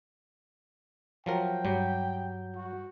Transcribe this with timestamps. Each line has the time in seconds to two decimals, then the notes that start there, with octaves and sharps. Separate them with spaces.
1.26 F3 F#3 A#4 G5
1.65 G2 F#3 G3 G6
2.55 F#4